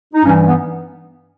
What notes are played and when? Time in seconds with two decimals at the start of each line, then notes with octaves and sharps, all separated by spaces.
0.14 D#4
0.24 G2 E3 G3 C#4
0.46 B3